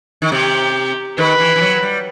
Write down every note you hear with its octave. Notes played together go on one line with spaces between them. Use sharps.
D#3
C3 G4
D#3 B4
E3
E3
F#3
G3